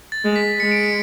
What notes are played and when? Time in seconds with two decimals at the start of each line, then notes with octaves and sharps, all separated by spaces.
0.12 A6
0.24 G#3
0.36 B6
0.60 G#3 C#7
0.72 D7
0.84 C#7